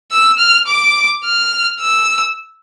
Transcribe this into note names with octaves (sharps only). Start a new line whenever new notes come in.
E6
F6
D6
F6
E6